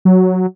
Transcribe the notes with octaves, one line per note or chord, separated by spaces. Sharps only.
F#3